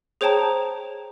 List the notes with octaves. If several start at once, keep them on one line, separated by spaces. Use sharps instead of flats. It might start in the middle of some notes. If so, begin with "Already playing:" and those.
G#4 C5 C#5 G5 A5 A#5